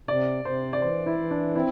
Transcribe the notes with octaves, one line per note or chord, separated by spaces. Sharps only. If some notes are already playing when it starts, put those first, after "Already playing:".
C3 D5
C3 C5
D5
E3 C5
E4
E3
D4
C4 E4